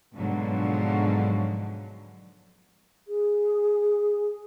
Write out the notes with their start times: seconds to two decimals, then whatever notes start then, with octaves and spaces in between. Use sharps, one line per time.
0.14 G#2 B2 D3 F3 F#3
3.08 G#4